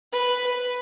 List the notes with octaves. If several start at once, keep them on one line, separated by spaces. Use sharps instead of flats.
B4
B4